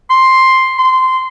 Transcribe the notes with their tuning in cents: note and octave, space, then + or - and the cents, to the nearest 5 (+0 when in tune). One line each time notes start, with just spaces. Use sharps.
C6 +5
C6 -15